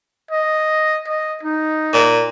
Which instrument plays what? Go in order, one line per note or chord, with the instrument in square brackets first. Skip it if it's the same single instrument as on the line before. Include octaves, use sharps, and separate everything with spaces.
[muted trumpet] D#5
D#5
D#4
[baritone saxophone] A#2